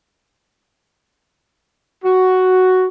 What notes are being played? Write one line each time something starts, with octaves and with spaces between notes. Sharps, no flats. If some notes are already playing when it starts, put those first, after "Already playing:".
F#4